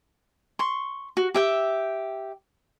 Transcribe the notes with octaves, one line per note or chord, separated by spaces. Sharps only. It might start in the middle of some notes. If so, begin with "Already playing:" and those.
C6 C#6
F#4
G4 E5 G5